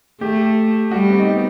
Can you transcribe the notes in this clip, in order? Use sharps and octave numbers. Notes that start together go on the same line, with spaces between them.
A3 G4
G3 F#4
C4
D#4
B3